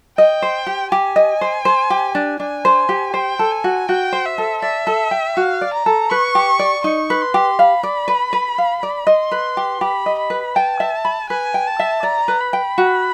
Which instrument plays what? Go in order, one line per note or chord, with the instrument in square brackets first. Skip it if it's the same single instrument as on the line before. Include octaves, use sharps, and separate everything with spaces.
[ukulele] D#5 [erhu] G5
[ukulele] C5
G4
[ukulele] G4 [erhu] G#5
[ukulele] D#5
C5
C5
G4
D4
[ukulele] D4 [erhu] G#5
[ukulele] C5
G4
[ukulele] C5 [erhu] G5
[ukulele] A4
[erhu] G#5
[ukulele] F#4
[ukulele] F#4 [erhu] G5
[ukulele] C5
[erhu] E5
[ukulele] A4
[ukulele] D5 [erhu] E5
[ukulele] A4
G5
[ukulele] F#4 [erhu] F5
[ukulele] D5
[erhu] A#5
[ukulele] A4
[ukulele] B4 [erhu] C#6
[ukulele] G4
D5
[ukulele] D#4 [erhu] C#6
[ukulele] B4
[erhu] C6
[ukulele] G4
[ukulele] F5 [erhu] B5
[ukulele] D5
B4
B4
F5
D5
[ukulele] D#5 [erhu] C6
[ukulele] B4
G4
[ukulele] G4 [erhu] B5
[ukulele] D#5
[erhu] B5
[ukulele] B4
[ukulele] G5 [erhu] A5
[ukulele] E5
B5
[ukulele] B4 [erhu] G#5
[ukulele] G5
[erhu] A5
[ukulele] E5
[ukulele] D5 [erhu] A#5
[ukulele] B4
[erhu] B5
[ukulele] G5
F#4